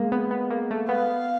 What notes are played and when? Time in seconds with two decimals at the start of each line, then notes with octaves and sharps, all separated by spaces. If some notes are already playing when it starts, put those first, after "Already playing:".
Already playing: G#3 A#3
0.12 B3
0.31 B3
0.51 A#3
0.71 A3
0.89 B3 F5